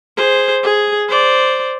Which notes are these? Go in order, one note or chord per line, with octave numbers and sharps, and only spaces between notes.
G#4 C5
G#4
C5 D5